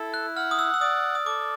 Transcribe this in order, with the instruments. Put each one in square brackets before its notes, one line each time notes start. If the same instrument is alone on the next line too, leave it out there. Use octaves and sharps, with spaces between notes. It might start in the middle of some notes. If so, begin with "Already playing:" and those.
Already playing: [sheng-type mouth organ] E4 A4
[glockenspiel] F#6
[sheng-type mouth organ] F#5 [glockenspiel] F6
[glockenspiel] D#6
E6
E6
[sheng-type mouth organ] D5 [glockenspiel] D#6
[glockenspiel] D#6
[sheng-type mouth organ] A4 [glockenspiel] D6